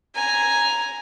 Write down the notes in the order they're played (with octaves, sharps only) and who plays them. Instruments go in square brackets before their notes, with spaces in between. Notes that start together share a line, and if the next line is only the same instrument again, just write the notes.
[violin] G#5 A#5